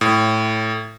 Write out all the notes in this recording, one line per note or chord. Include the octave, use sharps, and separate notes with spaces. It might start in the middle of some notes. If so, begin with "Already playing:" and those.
A2